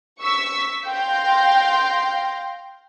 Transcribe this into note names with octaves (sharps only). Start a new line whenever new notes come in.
C#6 E6 B6
F5 G5 C6 G6 A#6